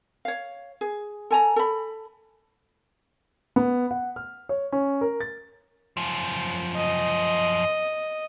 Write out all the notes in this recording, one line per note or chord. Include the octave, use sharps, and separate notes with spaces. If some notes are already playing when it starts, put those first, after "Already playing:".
C#5 F5
G#4
A4 G#5 A#5
A4 B5
B3
F#5
F6
C#5
C#4
A#4
A6
F#2 F3
D#5